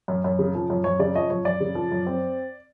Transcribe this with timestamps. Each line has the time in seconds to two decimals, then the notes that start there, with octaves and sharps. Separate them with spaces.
0.08 F#2
0.24 F#2
0.39 C#3
0.55 F3
0.70 F#2
0.84 F#2 C#5
0.99 C#3 D5
1.15 F3 C#5 D#5
1.30 F#2 C#5
1.45 F#2 D5
1.60 C#3
1.75 F3
1.92 F#2
2.06 C4